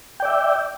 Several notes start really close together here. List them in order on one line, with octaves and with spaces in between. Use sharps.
G5 D5 E5